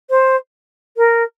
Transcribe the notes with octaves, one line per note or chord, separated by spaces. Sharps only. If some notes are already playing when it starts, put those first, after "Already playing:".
C5
A#4